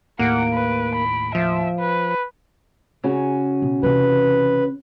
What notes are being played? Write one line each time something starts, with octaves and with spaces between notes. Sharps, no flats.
D#2 A2 A#3 F#5 D7
B4
B5
F3 E5
B4
C#3 C#4 F#4
B2
C3 E3 B4